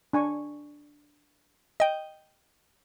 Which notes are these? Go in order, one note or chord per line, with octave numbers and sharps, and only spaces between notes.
D4 G#5 C#6
D#5 G5